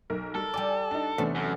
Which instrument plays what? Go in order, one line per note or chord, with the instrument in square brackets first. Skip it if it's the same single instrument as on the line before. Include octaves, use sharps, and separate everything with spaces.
[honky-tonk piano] B1 A#4
[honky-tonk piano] G3 A#4 [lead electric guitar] A4
[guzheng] G3 D5 [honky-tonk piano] G#5 D6
[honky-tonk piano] D4 D#4
[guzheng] E2 C3 C#4 [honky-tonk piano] A3 B3 D4
[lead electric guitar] F#2